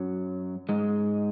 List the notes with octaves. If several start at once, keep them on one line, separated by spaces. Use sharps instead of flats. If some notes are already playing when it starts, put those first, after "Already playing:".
Already playing: F#2 F#3
G#2 G#3